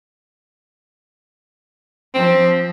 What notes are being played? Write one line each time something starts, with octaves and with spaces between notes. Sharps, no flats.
F3 C4